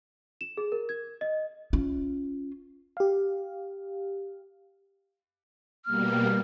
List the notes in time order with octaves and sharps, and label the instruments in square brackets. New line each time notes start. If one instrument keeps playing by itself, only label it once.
[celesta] E7
G#4
A#4
G#6
D#5
[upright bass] C#4 F4
[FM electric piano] G4 F5
[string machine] B2 G3 A#3 [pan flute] F6